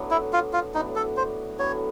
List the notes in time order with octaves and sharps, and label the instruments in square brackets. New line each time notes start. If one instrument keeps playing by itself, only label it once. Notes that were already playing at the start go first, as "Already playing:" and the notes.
Already playing: [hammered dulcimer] A2 F#3 B3 D4
[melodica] E4
F4
F4
[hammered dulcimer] A2 F#3 B3 D4 [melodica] D#4
[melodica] A4
C5
[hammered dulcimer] A2 F#3 B3 D4 [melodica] C#5